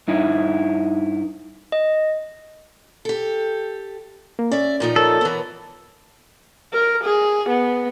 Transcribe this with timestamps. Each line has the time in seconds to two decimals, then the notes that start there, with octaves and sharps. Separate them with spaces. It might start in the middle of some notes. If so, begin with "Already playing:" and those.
0.08 G2 D#4 E4
1.72 D#5
3.05 G4 A4
4.39 A#3
4.52 C#4 D5 E5
4.80 A#2 F3 D#4
4.96 A4 A#4 C#5
5.21 E3 B3
6.73 A#4
7.04 G#4
7.49 B3